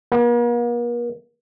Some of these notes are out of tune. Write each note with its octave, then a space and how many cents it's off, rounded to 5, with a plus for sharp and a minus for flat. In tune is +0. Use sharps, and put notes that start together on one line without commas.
A#3 +45